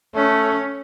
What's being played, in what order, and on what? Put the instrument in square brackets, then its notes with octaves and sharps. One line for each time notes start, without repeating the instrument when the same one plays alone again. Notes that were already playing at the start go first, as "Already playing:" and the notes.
[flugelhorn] A3 [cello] C#4